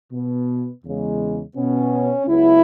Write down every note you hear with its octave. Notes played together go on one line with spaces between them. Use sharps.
B2 B3
E2 C#3 G#3
B2 B3 C#4
C#2 C#3 F#3 B3 E4